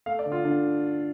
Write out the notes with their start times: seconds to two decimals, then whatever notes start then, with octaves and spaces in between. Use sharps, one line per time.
0.06 A3 F5
0.19 D5
0.25 D3
0.32 F4
0.45 D3 D4